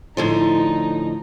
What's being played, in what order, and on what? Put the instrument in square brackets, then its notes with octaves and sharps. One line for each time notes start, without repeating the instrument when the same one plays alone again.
[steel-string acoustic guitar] A2 D3 F3 [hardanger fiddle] D#4